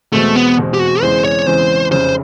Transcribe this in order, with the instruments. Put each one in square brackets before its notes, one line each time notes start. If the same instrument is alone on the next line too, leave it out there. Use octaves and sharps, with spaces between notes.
[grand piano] E2 B2 G#3 C4 [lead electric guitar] A3
[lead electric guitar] B3
[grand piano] E2 B2 G#3 C4
[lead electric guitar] G4
F#4
[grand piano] E2 C#3 E3 G#3 C4 [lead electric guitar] C5
[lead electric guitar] C#5
[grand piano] E2 C#3 E3 G#3 C4 [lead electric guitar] C5
[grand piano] F1 F2 C#3 [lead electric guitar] C5